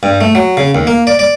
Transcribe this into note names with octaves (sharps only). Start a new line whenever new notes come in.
G2
A3
F#3
C#3
D#2
A#3
D5
D5